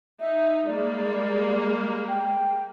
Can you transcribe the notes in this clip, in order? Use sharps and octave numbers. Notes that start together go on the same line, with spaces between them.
D#4 E5
G3 G#3 A#3 D5
G5